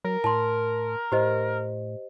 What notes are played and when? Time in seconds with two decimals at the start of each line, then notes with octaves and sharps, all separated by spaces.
0.04 F#3 A#4
0.24 A2 A5 C6
1.12 A2 G4 C5 D#5